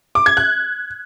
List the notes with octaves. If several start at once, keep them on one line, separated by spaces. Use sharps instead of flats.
D6
G#6
F#6